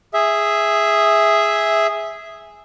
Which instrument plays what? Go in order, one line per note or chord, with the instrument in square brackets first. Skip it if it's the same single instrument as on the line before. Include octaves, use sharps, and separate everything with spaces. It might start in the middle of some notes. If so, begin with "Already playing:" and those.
[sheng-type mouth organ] G#4 E5